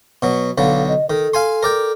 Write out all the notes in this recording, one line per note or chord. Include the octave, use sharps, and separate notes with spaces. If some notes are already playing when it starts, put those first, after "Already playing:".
B2 F#3
B1 D3 F#3 F5
D#5
D#3 A4
F5 G#5 C6
A#4 D5 G5